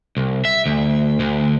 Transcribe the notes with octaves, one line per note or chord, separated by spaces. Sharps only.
C2
E5
D2
D2